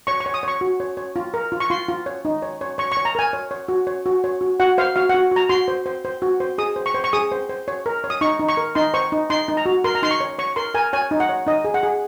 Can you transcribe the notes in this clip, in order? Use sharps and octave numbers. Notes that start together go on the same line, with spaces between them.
C#5 C#6
C#6
C#5
D#6
C#5 C#6
F#4
C#5
C#5
F4
A#4
F4
C#6
F4 C6
F4
C#5
D#4
C#5
C#5
C#5 C#6
C#6
C#5
A#5
A#4 G#5
C#5
C#5
F#4
C#5
F#4
C#5
F#4
F#4 F#5
C5 F5
F#4 F5
F#5
F#4
F#4 A#5
F#4 C6
C5
C5
C5
F#4
C5
G#4 D#6
C5
C#6
C5
C#6
G#4 D#6
C5
C5
C#5
A#4
C#5
D#6
D#4 C#6
D#4
C#6
A#4
D#4 C6
C5 C#6
D#4
D#4 C6
D#4
A#5
F#4
A#4 C6
A#5
D#4 C6
C#6
C#5
C#5 C#6
A#4 C6
A#4 G#5
C#5 G#5
D#4
F#5
C#5
D#4 D#5
G#4
F#5
G#4